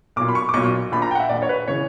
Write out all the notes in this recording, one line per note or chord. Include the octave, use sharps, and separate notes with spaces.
B1 A#2 D6
B5
C#6
D6
B1 A#2 C#6
A#1 A#2 B5
A#5
G5
F#5
E5
A#1 A#2 D5
C#5
B4
C#3 E3 C#5